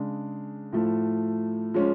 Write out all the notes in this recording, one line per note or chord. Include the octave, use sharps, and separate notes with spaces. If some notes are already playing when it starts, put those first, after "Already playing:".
Already playing: C#3 G#3 D4
A2 F3 A3
F3 G#3 C#4